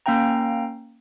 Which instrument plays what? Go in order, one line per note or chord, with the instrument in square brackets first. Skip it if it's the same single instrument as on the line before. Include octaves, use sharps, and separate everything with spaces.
[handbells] A#3 C#4 F5 G5 A#5